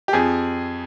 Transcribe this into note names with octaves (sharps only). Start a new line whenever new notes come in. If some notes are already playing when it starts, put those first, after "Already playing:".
G4
F2 G#4